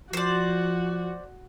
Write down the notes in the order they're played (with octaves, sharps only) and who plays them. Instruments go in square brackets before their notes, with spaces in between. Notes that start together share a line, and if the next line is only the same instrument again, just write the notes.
[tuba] F3 [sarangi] F#4 [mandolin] C5 D5